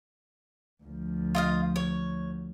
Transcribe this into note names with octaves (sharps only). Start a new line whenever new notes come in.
D2 F3
F4 D#5 F5
C#5